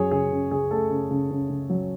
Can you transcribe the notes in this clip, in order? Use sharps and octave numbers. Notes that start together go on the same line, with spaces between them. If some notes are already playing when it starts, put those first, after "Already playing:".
Already playing: F#2 F#3 G#4 C#5
C#3 G#4
C#3
C#3 G#4
A3 A4
C#3
C#3
C#3
C#3
F#3